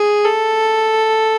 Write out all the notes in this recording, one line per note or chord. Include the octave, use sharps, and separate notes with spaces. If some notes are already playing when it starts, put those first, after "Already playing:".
Already playing: G#4
A4